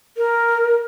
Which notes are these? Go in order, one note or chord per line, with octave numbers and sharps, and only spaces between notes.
A#4